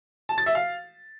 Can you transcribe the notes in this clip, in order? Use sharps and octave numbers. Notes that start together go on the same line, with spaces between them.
A5
A6
E5
F5